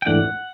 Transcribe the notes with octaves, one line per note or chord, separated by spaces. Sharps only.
G5
G#2 E3 A3 D4 F#5